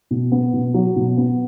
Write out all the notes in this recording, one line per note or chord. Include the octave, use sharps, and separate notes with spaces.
B2
B3
B2
F#3
B2
B3